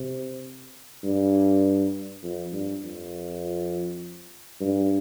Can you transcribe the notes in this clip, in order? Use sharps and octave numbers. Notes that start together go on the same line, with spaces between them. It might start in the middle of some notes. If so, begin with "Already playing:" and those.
Already playing: C3
G2
F2
G2
F2
G2